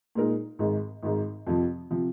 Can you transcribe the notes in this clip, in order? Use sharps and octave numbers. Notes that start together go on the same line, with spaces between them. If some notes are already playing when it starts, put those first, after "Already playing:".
A#2 G#3 D#4 A#4
G#1 G#2 G#3
G#1 G#2 G#3
F2 C3 F3
C3 F3